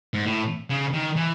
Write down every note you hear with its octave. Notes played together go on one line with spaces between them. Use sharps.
G#2
A2
C#3
D#3
E3